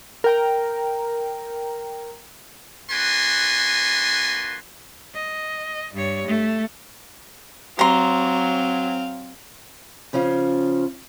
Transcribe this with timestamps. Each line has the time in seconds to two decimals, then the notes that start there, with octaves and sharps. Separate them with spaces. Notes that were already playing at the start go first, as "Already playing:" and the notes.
0.24 A#4 G5 A#5
2.91 A#3 D4 F#4 B4 G#5 C6
5.14 D#5
5.93 G2 C#5
6.27 A3
7.79 F#3 C4 F5 A#5 C6
10.13 C#3 F3 C#4 F4